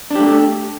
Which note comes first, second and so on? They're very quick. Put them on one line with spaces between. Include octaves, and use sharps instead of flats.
D4 G4 A3